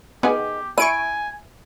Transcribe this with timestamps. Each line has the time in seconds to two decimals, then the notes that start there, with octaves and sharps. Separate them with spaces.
0.23 D#3 B3 G4 G#4
0.78 E4 G#5 C#6 D7 D#7